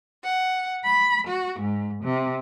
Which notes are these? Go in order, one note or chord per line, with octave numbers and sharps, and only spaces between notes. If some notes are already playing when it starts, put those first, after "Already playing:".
F#5
B5
F#4
G#2
C3